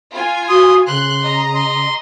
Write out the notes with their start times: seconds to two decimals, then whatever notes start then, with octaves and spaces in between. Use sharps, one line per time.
0.12 F4 G#5
0.49 F#4 C6 D#6
0.87 C#3 C6 F#6
1.22 D#5 A#5
1.55 C6